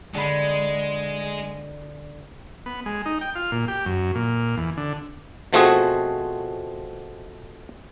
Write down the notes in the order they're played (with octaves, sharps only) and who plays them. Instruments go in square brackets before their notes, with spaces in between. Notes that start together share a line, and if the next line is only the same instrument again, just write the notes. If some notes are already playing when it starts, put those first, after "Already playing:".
[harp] D3 B5 [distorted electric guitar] G#3
[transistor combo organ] B3
G#3
D#4
G5
F4
A#2
G4
F#2
A#2
E2
D3
[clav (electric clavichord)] B2 F3 A3 C4 F#4 G#4